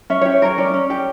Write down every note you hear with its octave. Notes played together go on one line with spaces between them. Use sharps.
C#4 E5
G4 C#5
A#4 C#5
C#4 D5
C#4
G4